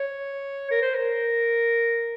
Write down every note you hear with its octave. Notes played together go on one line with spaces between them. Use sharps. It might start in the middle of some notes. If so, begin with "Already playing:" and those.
Already playing: C#5
A#4
C5
A#4